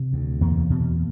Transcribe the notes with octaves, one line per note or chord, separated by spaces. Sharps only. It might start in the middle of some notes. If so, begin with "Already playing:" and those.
Already playing: C3
D2
E2 A#3
B2